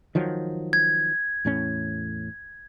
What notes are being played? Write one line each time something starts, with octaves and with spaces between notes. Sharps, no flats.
D#3 F3 F#3
G#6
E2 A2 C#4